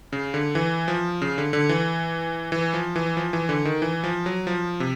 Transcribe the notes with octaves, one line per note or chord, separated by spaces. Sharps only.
C#3
D3
E3
F3
C#3
D3
D3
E3
E3
F3
E3
F3
E3
D3
D#3
E3
F3
F#3
F3
C3